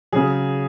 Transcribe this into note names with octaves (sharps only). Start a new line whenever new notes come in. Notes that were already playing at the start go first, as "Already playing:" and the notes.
C#3 F#3 G#4